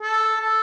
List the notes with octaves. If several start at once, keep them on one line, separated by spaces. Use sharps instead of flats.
A4
A4